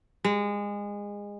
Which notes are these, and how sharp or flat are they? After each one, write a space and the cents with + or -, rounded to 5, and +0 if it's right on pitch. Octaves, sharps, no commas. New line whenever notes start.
G#3 -25